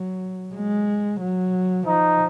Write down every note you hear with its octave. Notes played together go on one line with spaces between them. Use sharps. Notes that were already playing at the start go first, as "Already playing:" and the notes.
Already playing: F#3
G#3
F#3
F3 D#4